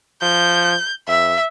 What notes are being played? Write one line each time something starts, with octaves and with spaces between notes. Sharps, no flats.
F3 G6
F2 E5